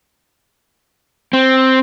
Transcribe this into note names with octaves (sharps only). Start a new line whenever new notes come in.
C4